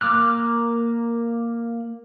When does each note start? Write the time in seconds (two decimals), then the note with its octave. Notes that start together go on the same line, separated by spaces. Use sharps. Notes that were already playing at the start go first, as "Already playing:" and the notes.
0.01 A#3 D6 F6 F#6